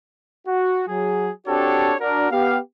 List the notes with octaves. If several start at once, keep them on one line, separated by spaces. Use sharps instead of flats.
F#4
F#3 G#4
C4 D4 F#4 G4 A4 C#5
D4 F#4 A#4
B3 G4 F5